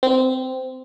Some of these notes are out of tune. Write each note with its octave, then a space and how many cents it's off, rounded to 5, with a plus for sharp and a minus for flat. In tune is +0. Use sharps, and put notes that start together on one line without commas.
C4 -15